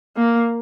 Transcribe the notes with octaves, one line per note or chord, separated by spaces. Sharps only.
A#3